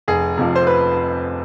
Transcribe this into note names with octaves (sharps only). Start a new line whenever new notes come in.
F1 G#4
F2 C3 F3
C5
B4